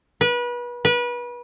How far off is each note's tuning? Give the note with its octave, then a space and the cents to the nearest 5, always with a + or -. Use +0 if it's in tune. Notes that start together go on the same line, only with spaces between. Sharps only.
B4 -30
B4 -30